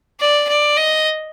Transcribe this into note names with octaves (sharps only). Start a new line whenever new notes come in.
D5
D5
D#5